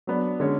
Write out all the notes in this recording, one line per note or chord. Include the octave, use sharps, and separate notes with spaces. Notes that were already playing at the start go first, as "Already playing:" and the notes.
F#3 B3 D4
D3 G#3 C#4